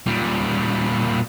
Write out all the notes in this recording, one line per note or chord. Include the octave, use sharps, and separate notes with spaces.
A#2 G3